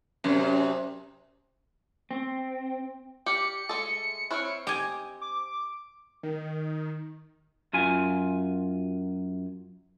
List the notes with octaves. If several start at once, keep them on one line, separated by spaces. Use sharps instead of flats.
F#2 C3
C4
G4 D5 D6 F6 C#7
G#3 A3 A4 D#5
C4 E4 C#5 F6 F#6
G4 D#5 G#5
D6
D#3
F#2 F4 G#5